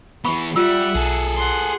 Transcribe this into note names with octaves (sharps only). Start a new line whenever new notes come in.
E3 B3 B5 C#6
G3 F4 E5 F#5 E6
B1 G#4 A4
F#5 C6